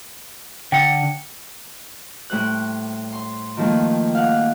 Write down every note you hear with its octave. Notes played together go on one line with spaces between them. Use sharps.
D3 G5 C#7
A2 G3 C5 F#6
C6
D#3 F3 G3 A3 A#3 F4
F5 F#5